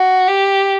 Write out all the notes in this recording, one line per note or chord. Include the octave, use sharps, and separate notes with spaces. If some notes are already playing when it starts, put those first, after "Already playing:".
Already playing: F#4
G4